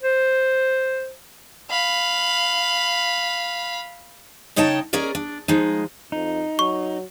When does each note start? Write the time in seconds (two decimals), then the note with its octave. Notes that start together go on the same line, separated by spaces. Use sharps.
0.03 C5
1.70 F5 B5
4.56 C#3 D#4 C#5 D#5 G5 A5
4.93 C#4 G#4 A#4 D5 D#5
5.15 D4
5.48 F3 G#3 D#4
6.12 F2 D#4
6.59 F#3 C#6